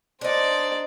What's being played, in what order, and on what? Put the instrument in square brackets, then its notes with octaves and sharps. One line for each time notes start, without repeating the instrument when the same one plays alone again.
[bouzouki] D4 D#4 [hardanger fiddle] C5 D5